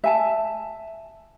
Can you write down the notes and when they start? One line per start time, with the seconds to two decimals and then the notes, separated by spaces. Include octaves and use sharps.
0.04 E5 G#5 A5